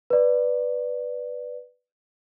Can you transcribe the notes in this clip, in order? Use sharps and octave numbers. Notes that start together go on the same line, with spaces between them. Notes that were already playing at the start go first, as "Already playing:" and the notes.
B4 D5